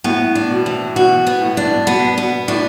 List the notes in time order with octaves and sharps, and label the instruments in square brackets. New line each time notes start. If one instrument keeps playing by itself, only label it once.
[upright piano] A2 [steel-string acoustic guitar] B3
[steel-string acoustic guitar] D4
[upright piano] B2
[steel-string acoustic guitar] E3
[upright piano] B2 [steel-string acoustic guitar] F#4
[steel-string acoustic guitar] B3
[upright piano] A2
[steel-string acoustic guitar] D4
[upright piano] B2 [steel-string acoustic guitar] B3
[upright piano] B2 [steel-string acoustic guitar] B3
[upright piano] A2 [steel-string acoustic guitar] D4